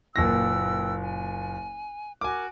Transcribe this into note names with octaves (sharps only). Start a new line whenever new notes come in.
F#1 A#2 B4 G5 E6 A#6
G#5
F#4 A#4 G#5 D6